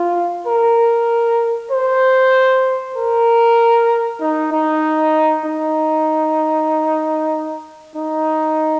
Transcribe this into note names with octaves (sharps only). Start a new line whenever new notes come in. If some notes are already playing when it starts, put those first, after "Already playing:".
Already playing: F4
A#4
C5
A#4
D#4
D#4
D#4
D#4